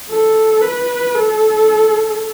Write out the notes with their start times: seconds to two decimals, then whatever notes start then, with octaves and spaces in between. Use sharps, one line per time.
0.10 A4
0.62 B4
1.15 A4